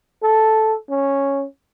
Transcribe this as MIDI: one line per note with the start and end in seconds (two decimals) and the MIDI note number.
0.23 0.75 69
0.89 1.44 61